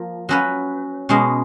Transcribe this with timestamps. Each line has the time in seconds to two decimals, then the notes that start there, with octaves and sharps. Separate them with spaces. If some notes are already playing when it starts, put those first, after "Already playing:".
Already playing: F3 A#3
0.29 F#3 C#4 F#4 B4
1.09 B2 G#3 C#4